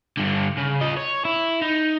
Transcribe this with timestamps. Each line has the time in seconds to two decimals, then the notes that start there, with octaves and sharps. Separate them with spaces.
0.17 G2 D3
0.58 C#3
0.81 F4 D#5
0.97 C#5
1.25 E4
1.61 D#4